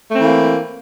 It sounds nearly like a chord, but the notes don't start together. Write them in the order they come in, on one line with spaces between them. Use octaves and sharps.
A3 C4 E3 A#3